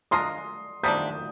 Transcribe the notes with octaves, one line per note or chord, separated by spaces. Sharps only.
G#3 D4 F4 A#4 C6 D#6
C3 G3 A#3 D4 D#6 G6